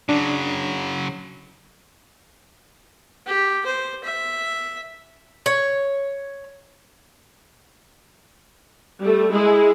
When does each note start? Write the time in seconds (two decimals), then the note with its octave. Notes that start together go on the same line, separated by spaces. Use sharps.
0.09 C#3 F#3 D4
3.27 G4
3.66 C5
4.04 E5
5.46 C#5
9.00 G3 A3
9.33 G#3 E4 G#4